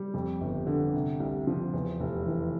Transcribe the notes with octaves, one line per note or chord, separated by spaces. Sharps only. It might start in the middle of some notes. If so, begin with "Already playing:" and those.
Already playing: G3
F2
G1
D3
C3
C2
F3
E2
F1
E3